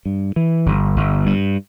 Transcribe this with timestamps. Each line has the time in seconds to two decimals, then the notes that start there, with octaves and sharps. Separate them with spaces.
0.06 G2
0.36 E3
0.66 G1
0.96 G1
1.26 G2